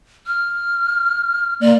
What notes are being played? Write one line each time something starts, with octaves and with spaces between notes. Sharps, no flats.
F6
A#3 D5